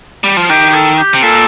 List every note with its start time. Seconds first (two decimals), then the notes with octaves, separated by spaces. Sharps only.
0.24 G3
0.37 F3
0.43 F4
0.50 D#3 G4
0.70 G4
0.74 A4
0.99 G4
1.14 C3
1.22 A#2 A4